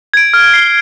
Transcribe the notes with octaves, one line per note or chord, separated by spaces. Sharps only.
G#6 D7
F6
C7 G7